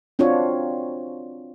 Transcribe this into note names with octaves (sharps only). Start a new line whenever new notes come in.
C4 D4 F4 F#4 C#5